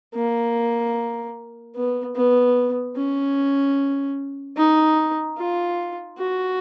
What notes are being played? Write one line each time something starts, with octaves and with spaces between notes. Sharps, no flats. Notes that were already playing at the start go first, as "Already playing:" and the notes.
A#3
B3
B3
C#4
D#4
F4
F#4